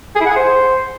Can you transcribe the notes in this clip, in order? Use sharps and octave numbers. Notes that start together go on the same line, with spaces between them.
G#4
E4
F#5
G#4
C5